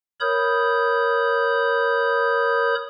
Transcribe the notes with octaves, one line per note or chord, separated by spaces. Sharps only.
A#4 C#5 B5 D#6 G6